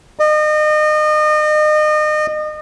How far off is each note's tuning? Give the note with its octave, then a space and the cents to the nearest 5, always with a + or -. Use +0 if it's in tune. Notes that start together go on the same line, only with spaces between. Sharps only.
D#5 -35